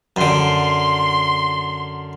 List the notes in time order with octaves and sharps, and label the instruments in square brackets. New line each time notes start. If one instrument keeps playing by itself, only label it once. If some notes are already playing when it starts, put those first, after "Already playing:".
[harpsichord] F#2 D3 [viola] C6